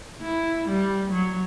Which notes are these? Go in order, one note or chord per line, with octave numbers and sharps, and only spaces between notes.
E4
G3
F#3